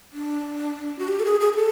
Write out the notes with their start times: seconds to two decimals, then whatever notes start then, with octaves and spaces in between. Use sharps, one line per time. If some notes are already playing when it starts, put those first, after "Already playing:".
0.12 D4
0.99 F#4
1.08 G4
1.20 A4
1.25 G#4
1.40 G#4
1.53 G#4
1.56 A4